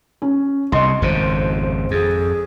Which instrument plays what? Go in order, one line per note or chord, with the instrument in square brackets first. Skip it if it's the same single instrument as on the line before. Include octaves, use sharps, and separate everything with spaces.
[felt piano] C#4
[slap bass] C2 C3 [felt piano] D#5 C6
[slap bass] G#1 F2 C#3 [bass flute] C5
[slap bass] F2 [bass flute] G#4